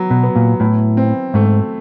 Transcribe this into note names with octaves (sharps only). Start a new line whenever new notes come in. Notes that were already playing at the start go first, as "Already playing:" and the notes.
Already playing: F#3 B3
B2
B3
A#2
A2 E4
C4
G#2 A3